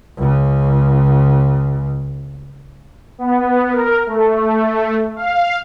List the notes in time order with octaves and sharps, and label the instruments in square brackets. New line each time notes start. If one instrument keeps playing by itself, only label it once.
[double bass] C#2 C#3
[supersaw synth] B3
A#4
A3
F5